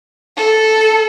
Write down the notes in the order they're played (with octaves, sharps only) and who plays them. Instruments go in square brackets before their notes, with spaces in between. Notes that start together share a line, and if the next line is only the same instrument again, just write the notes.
[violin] A4